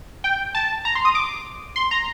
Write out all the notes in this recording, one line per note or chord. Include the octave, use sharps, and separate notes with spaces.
G5
A5
A#5
C6
D#6
D6
C6
A#5